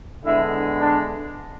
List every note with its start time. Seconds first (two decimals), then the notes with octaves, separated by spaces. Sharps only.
0.25 D3 G#3 B3 D4 E4 E5
0.80 D4 D5